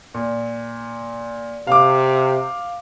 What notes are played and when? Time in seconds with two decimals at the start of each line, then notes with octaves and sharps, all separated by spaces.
0.14 A#2
1.67 C3 F5 D6